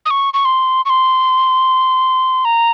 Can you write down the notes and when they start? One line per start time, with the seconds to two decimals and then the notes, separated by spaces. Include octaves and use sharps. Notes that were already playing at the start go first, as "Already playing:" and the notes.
0.06 D#6
0.10 C#6
0.34 C#6
0.45 C6
0.85 C#6
0.90 C6
2.45 A#5